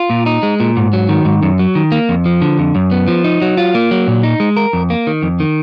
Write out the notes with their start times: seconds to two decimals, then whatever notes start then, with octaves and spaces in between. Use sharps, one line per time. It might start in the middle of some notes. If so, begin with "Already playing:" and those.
Already playing: F4
0.10 A#2
0.26 D#4
0.43 G#3
0.60 A#2
0.77 G#2
0.93 F#3
1.09 D#3
1.25 G#2
1.43 F#2
1.59 F#3
1.75 D#3
1.92 A#3
2.09 F2
2.25 F3
2.42 D3
2.59 F2
2.75 F#2
2.91 B3
3.08 F3
3.24 D#4
3.42 F#3
3.57 F4
3.75 A#3
3.91 F#3
4.08 A#2
4.23 D#4
4.40 G#3
4.57 A#4
4.73 F2
4.90 A#3
5.07 D#3
5.23 F2
5.40 D#3